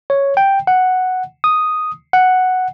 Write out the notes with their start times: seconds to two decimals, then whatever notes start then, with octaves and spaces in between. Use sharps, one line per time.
0.10 C#5
0.37 G5
0.67 F#5
1.44 D#6
2.13 F#5